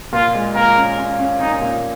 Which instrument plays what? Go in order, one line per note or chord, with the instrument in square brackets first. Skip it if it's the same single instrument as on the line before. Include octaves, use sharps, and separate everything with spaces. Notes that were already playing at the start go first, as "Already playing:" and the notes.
[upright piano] A#2 [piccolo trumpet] F4
[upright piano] G#3
[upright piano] A#2 [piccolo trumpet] A#4
[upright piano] C#4
C#4
C#4
[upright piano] C#4 [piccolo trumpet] D#4
[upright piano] A#2